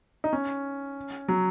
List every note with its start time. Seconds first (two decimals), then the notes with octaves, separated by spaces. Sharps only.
0.24 D#4
0.33 C#4
1.28 F#3